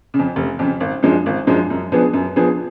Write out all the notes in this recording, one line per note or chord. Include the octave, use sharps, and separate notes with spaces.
C#3
F2
F1
F2 C#3
G#1
F#2 F3 G#3 D4
G#1
F#2 F3 G#3 D4
F#2
F3 B3 D4 G#4
F#2
F3 B3 D4 G#4